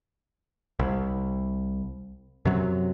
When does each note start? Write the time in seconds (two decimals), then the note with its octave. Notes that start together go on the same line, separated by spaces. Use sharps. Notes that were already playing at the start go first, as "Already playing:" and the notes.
0.79 C2
2.45 F#2 C3 F#3